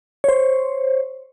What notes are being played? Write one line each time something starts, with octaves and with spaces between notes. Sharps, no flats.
C5 C#5